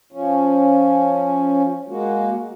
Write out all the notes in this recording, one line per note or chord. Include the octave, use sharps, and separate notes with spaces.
F3 C#4
G#3 A#3 F#4